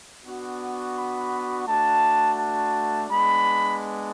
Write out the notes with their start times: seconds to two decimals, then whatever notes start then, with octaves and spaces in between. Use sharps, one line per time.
0.25 B3 D4 F#4
0.96 B5
1.67 A3 D4 F#4 A5
2.39 A5
3.10 G#3 B3 D4 B5